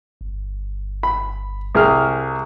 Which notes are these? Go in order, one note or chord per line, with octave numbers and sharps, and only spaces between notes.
G1
B5
C2 G#4 F6